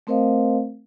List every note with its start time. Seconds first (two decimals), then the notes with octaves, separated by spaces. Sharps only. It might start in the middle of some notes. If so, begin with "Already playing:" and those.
0.07 A3 C4 A#4 C5 D#5 F5